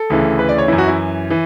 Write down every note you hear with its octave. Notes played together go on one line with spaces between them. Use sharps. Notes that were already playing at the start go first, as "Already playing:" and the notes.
Already playing: A4
D2 C#3 E3
B4
D5
C#5
F#2 E3 E4
F#4
E4
E3